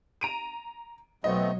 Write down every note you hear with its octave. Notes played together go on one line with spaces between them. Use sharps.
A#5 D7 D#7
B1 F#3 A3 B3 C4 D#5